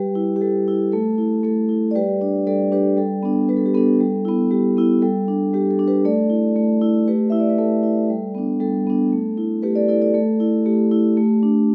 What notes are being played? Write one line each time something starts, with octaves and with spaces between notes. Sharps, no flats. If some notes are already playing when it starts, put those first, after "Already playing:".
Already playing: G3 G4 B4
E4
G4
G3 A4
E4
A3 A4
E4
A3 A4
E4
D5
G3 G4 B4
D4
G3 A4 D5
D4 G4 B4
G3 A4
B3 D4
G3 B4
A4
G4
B3 D4 A4
G3
B3 E4
G3 G4
B3 E4
G3 A4
D4
G3 G4
A4
D4
G4 B4
A3 A4 D5
E4
A3
E4
A3 G4 B4
E4 E5
D5
B4
A3 A4
E4
G3
B3 D4
G3 A4
B3 D4
A3
E4
A3 G4 B4
A4 D5
E4 A4 D5
A4 D5
A3 A4
E4
A3 G4
E4
A3
D4